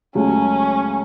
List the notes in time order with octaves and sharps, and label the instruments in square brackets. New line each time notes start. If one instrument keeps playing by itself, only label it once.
[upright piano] C#2 C#3 F#3 A3 [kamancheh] C#4